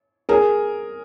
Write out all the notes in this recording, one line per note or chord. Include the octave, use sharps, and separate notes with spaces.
G#4 A#4